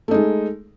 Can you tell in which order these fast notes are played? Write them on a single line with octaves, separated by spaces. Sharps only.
A3 D#4 G#3